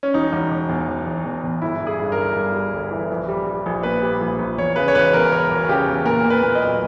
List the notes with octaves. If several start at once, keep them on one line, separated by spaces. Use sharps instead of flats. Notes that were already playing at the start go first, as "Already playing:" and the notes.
C#4
E1 D#4
E1
E1
E2
E1
E1
E2
E2
G1 E4
G2
G#4
G2
A#4
G1
G2
G3
G1
E3
A#1
G3
G3
A#1
A#2 B4
G3
A#1
A#1
E2 C#5
C#3 B4
C#5
E1 B4
E2 A#4
E1 A#4
E1
C#3 G4
E2
A#2 A#4
A#2
B4
A#2
D#5
B1